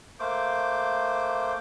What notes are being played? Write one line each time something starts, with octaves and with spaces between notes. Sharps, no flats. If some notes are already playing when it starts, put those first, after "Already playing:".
A3 A#3 C5 D6